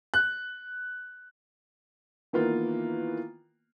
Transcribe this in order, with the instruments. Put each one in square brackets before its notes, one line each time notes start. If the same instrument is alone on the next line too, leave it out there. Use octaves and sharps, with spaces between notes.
[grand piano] F#6
D#3 E3 A#3 B3 F4